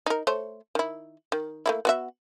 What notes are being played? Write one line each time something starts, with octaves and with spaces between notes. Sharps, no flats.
D#4 A#4
A3 C5 C#5
D#3 E4
D#3
A3 A#3 E4
B3 F#4 E5